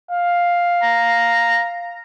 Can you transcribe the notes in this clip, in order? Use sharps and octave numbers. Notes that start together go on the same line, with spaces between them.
F5
A#5